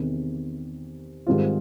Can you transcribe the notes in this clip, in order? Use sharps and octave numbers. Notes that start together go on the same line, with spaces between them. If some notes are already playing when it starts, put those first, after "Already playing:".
Already playing: E2 C3 D#3
G#2 D#3 G3 C4 F4